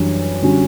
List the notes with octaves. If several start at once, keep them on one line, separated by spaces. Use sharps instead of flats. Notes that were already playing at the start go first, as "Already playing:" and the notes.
Already playing: F#2 E3 G3 D4
D3 G3 C#4 F#4